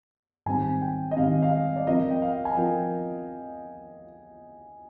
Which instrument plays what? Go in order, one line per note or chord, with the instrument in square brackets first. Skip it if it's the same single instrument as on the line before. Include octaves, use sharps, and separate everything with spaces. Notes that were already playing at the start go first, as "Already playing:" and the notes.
[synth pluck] G#2 D#3 G3 C4 [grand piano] G#5
[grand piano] G5
D#5
[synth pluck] G#2 D#3 G3 C4 [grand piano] F5
[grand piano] F5
D#5
D5
[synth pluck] F3 C4 F4 A#4 [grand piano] D#5
[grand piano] G5
F5
G#5
[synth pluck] F3 C4 F4 A#4 [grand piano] G5